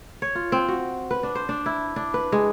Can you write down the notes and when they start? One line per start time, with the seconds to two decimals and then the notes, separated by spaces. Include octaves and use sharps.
0.22 C#5
0.35 F4
0.52 C4
0.68 F#4
1.11 B4
1.23 D4
1.35 C5
1.49 D4
1.66 E4
1.96 D4
2.14 B4
2.32 G#3